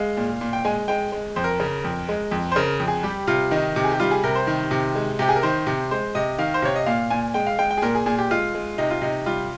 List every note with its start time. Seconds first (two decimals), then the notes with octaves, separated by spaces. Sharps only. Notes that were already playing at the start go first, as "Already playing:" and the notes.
Already playing: G#3 F5
0.17 A#2
0.41 A#2
0.53 G5
0.65 G#3 G#5
0.88 G#3 G5
1.12 G#3
1.36 F2 C5
1.44 A#4
1.60 C#3
1.84 F2
2.09 G#3
2.31 F2
2.52 C5
2.56 C#3 A#4
2.80 F2
2.88 G#4
3.03 G3 G4
3.27 C3 F4
3.51 D#3 D#4
3.76 C3
3.84 G#4
3.91 G4
4.00 G3 F4
4.11 G#4
4.24 C3 A#4
4.35 C5
4.47 D#3
4.71 C3
4.95 G#3
5.19 C3 G4
5.29 G#4
5.36 A#4
5.43 D#3 C5
5.67 C3
5.91 G#3 C5
6.15 C3 D#5
6.38 D#3 F5
6.54 C5
6.62 C3 C#5
6.76 D#5
6.86 A#2 F5
7.10 A#2 G#5
7.34 G#3 G5
7.47 F5
7.59 G#3 G5
7.71 G5
7.78 G#4
7.82 A#2 A#4
7.95 G#4
8.06 A#2 G#4
8.18 G4
8.31 G#3 F4
8.55 G#3
8.78 C3 D#4
8.90 F4
9.02 C3 D#4
9.26 G3 F4